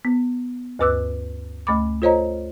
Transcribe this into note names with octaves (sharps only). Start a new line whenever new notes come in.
B3
D2 G2 B4 D6 E6 F#6
D2 A3 B5 D6
F4 A4 C5 C#5 D#5 A#5